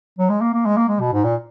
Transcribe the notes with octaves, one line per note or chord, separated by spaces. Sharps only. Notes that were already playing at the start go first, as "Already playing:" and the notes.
F#3
G#3
A#3
A#3
G#3
A#3
G#3
B2
G#2
A#2